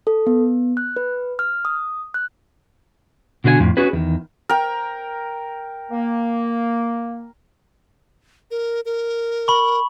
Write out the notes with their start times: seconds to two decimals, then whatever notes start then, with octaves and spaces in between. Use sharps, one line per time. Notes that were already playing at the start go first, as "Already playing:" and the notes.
0.07 A4
0.27 B3
0.77 F#6
0.96 B4
1.39 F6
1.65 D#6
2.14 F#6
3.44 B2 D3 F#4 B4 G#5
3.60 F2 A2
3.77 C#4 F#4 G#4 B4
3.93 E2 D#3
4.49 A#4 G5
5.91 A#3
8.51 A#4
8.85 A#4
9.48 B5 C#6